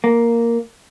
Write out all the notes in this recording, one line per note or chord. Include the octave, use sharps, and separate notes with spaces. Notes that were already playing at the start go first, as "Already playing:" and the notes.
A#3